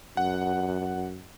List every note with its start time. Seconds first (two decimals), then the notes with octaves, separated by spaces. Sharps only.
0.17 F#2 F#5